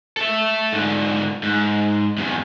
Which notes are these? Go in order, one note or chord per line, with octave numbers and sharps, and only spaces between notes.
A4 E5
G#2 D3
G#2
E2 G2